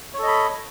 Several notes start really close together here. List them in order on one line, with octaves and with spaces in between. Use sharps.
C#5 A4 D#5 B5